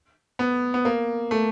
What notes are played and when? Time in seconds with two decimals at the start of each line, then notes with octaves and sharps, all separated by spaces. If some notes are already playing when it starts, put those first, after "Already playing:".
0.39 B3
0.74 B3
0.85 A#3
1.31 A3